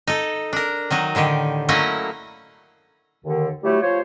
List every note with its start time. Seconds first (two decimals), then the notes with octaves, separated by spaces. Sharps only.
0.07 D#4 A4
0.53 D4 A#4
0.90 D#3 F#3 D#4
1.15 A2 D3 D#3 G4
1.69 F#3 A3 A#3 C#4 E4 D#5
3.25 D#2 D3 D#3
3.63 F#3 G3 A3 E4 G4
3.82 F3 F4 C5 C#5